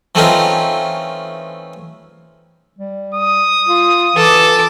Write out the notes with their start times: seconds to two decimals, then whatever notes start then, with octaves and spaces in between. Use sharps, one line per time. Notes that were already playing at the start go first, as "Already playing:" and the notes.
0.15 E3 A3 C4 C#4 D#4 F4
2.79 G3
3.15 D#6
3.68 F4
4.16 E3 A4 D6